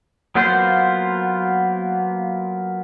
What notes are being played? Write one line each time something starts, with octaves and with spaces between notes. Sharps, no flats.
F#3 A#3 B3 F4 C5